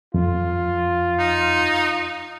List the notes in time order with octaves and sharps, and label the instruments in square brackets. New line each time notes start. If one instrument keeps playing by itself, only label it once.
[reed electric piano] F2 [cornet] F4
[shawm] D#4